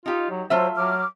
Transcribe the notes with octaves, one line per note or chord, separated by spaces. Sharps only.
D#4 F4 G4
F#3
F#3 A3 F4 C5 E5
F#3 D6 F6